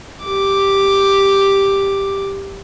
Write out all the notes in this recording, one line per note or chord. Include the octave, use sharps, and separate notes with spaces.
G4 D6